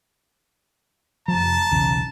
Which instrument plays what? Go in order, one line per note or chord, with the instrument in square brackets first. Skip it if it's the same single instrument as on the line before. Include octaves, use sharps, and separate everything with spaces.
[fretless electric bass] F1 F3 [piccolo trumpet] A5 [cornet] A#5
[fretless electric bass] B1 E2 C#3